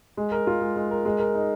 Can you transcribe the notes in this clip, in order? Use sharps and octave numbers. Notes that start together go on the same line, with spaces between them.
G#3
A#4
F4
G#3
G#3
A#4
G#3
A#4
D#4